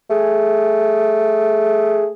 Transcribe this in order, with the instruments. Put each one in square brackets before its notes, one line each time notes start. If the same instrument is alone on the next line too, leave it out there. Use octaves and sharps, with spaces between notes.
[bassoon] A3 [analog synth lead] G#4